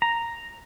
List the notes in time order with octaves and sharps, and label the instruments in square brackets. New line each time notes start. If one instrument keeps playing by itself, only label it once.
[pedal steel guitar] A#5